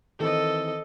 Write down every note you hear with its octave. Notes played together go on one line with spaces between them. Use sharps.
D#3 E3 C4 A4 D#5